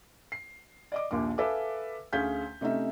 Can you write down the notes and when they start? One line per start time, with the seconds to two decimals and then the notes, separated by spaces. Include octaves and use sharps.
0.32 C7
0.92 D5 D#5 D6
1.11 A#1 D#2 A#2 D6
1.38 A4 B4 E5 F5 G#5 D6
2.13 D2 C#4 G#4 F5 G6 B6
2.61 C3 A3 C#4 D#4 E5